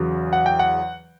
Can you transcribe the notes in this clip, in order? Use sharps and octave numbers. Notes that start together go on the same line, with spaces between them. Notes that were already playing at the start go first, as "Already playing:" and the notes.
Already playing: E2 C#3 F#3
F#5
G5
F#5